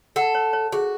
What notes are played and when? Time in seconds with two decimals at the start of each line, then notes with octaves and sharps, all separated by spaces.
0.16 A4 F#5
0.35 C#5
0.53 C#5
0.72 F#4 G#4